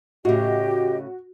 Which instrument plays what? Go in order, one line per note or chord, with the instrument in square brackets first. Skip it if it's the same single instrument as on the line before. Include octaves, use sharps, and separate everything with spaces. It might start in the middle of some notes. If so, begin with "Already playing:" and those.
[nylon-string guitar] A2 C#3 [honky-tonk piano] F#4 [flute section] G4 D#5